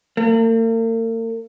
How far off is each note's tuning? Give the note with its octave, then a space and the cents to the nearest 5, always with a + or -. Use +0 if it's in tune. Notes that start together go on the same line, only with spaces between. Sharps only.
A#3 -45